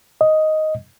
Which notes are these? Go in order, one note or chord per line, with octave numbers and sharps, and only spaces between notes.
D#5